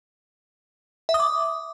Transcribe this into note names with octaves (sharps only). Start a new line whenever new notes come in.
E5
D#6
D6